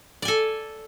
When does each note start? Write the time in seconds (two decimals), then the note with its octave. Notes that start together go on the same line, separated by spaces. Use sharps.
0.22 D5
0.25 G#5
0.28 A4